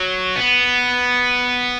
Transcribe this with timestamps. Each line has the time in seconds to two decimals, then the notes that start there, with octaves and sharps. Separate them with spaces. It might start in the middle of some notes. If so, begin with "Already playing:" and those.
Already playing: F#3
0.36 B3